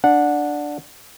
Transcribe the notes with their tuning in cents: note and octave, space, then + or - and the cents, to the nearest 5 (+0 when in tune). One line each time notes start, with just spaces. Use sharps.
D4 +0 F#5 -15